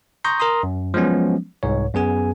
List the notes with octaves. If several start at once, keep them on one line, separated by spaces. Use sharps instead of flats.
A#5 C6 C#6 D#6 G6 A#6
A#4 A#5 C6 D#6
F#2
F3 F#3 G#3 B3 C#4
C2 G#2 C#5
F#2 B3 G#4 G#5